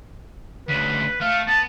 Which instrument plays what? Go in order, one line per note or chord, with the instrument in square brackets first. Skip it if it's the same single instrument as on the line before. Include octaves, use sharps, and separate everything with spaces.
[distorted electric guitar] D2 C#3 [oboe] B4
[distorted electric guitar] A3 [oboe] F5
[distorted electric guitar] B3 [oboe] A5